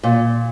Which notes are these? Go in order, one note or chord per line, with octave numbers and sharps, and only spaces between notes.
A#2